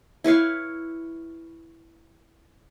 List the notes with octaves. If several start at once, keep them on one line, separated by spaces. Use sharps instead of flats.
E4 B4 C#5 F5